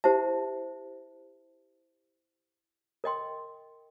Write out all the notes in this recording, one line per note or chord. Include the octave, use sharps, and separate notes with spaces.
E4 G4 C5 E5 A5
A#4 D#5 G5 C6